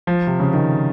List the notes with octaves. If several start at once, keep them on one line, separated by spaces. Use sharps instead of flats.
F3
C3
C#3
D#3